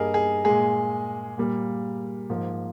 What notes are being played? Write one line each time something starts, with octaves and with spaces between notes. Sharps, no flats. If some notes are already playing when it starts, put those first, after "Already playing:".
Already playing: G2 G3 A#3 G#4 A#4 D#5
G#4
A#2 G#3 G#4
A#2 G3 A#3
G#2 F3 A#3